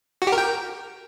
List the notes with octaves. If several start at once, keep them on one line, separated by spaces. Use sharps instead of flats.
F#4
G4
A#4
G5